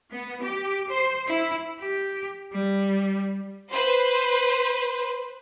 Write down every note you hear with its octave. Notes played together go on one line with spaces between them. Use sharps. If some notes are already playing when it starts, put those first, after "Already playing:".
B3
G4
C5
E4
G4
G3
B4 C5